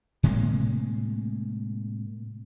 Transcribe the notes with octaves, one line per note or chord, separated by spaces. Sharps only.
A2 C3 G#3 A#3